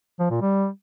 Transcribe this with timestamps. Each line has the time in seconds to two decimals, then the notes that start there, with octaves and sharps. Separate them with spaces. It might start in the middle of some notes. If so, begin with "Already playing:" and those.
0.19 F3
0.30 A#2
0.42 G3